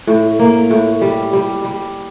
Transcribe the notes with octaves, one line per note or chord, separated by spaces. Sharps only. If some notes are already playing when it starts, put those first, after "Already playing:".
A2
A#3
A2
G3
G3
G3